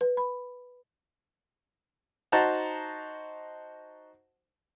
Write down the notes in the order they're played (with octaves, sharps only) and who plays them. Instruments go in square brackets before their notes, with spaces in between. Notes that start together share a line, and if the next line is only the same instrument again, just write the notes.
[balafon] B4
B5
[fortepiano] D#4 F#4 C5 F#5 A5 A#5